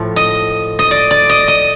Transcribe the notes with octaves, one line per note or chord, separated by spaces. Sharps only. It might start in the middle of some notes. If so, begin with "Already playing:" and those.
Already playing: A2 F3
D#5
D#5
D5
D5
D#5
D#5